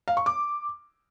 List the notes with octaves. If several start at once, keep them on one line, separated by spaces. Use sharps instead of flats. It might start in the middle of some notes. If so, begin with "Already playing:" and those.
F5
C#6
D6